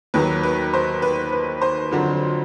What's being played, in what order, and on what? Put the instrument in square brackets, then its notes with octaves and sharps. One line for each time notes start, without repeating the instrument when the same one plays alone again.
[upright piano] D#2 D#3 F#3 B4
B4
C5
B4
B4
C5
F2 D3 F#3